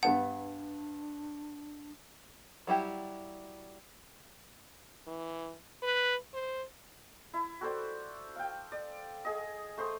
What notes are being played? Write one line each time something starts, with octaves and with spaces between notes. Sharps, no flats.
G2 B3 D4 F#5 A5
F#3 G3 E4 G4
E3
B4
C5
E4
F#4 A4 C5 D5
F5 G5
D5
G#4 D#5
A3 C5 C6 D#6